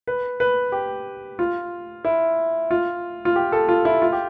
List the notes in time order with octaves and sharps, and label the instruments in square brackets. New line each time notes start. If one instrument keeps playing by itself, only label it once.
[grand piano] B4
B4
G4
F4
E4
F4
F4
G4
A4
F4
E4
F4
G4